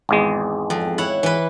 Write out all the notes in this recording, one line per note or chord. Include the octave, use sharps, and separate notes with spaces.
G#1 E2 G#3
F2
E4 C#5 F#5
E3 B4